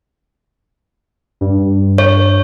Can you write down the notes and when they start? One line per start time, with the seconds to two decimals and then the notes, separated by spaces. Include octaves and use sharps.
1.41 G2
1.98 C#5